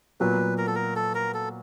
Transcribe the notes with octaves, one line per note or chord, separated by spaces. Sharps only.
A#2 F#3 B3 B4
A#4
A4
A#4
A4
A#4
A4